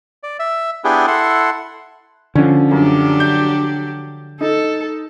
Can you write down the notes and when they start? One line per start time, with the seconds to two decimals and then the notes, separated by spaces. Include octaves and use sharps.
0.23 D5
0.40 E5
0.84 B3 D4 E4 G4 G#4
1.07 E4 A4 F#5 C6
2.35 D3 F3 C#4
2.71 F#2 F#3 D4 G4
3.20 G6
4.40 D#4 A4